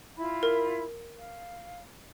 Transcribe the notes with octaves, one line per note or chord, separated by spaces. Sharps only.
E4 F4 B5
A#4
F5